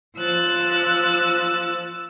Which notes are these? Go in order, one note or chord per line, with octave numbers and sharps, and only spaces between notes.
F3 E6 F#6 A6